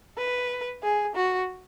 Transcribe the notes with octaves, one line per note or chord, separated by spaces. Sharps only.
B4
G#4
F#4